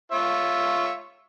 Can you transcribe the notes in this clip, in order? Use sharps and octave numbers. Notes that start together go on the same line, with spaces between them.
F4 C#5 E5